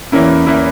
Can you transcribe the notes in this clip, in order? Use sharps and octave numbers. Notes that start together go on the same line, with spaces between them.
E2 E3 A#3 C#4 E4
E3 A#3 E4